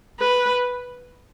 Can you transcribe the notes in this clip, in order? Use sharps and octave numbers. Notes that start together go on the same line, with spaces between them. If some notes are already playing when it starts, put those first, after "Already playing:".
B4